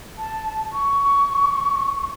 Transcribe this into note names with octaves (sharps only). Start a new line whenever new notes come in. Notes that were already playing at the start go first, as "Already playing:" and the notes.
A5
C#6